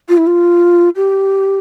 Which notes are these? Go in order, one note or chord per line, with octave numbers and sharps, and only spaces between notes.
F4
E4
F4
G4